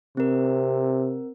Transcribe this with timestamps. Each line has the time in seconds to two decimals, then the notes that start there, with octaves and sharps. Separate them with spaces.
0.17 C3 C4 A#4